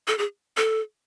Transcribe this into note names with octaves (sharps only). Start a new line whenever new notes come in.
A4
G#4
A4